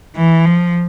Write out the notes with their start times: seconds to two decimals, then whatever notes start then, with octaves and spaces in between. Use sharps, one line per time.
0.16 E3
0.46 F3